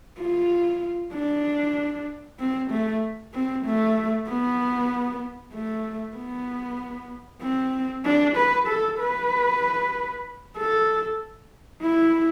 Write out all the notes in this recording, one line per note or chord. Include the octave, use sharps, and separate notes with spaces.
F4
D4
C4
A3
C4
A3
B3
A3
B3
C4
D4
B4
A4
B4
A4
E4